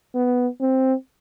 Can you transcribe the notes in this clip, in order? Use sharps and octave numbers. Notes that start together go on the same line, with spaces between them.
B3
C4